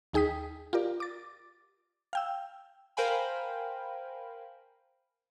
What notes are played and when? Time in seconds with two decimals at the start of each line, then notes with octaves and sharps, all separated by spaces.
0.13 D#2 D#4 G#4 G5 D#6 B6
0.73 F4 G4 A#4 D5
1.00 D6 A6
2.13 F5 G5 E6
2.97 A#4 C5 F5 G5 G#5 B5